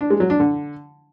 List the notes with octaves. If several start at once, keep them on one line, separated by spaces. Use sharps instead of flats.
D4
G#3
F#3
D4
D3